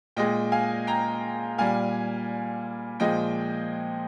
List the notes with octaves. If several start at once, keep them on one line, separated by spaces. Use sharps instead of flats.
A#2 G#3 D#5 G5
F5 G#5
G5 A#5
A#2 G3 F5 G#5
A#2 F3 G#3 D#5 G5